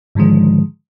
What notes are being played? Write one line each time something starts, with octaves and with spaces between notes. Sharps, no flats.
G#2 D3 D#3 F3 G#3